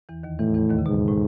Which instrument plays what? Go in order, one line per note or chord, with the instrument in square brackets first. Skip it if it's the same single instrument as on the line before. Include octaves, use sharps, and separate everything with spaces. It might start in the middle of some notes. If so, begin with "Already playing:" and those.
[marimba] E2 E3
D#2 D#3
[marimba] E2 E3 [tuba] A2
[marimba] E2 E3
D#2 D#3
C#3
[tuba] G#2 [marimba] B2
[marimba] A2